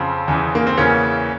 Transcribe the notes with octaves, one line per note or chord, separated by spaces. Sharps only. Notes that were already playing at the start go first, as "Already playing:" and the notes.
Already playing: F2 C#3 F3 C4
E2 C#3 E3
A#3
C4
E2 C#3 E3 A#3 C#4